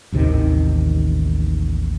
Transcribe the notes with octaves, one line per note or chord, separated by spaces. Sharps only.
A1 D#2 C3 D#3